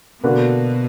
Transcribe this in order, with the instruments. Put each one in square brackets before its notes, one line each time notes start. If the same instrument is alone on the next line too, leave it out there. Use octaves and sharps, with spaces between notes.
[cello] B2 [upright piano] D3 A#3 D4 F#4 B4